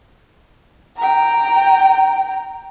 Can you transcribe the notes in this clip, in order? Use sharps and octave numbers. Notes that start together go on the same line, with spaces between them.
G5 A#5